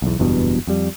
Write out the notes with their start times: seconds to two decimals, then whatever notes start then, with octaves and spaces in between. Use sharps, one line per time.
0.02 B1 E2
0.19 F#1 E2 G2 B2
0.67 F2 G3